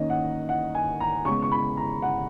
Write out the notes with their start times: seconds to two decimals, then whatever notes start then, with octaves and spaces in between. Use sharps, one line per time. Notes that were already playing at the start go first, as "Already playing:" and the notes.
Already playing: D#3 A#3 C#4 D#5
0.10 F#5
0.49 F#5
0.75 G#5
1.00 A#5
1.25 C#3 G#3 B3 C#6
1.42 C#6
1.51 B5
1.77 A#5
2.02 F#5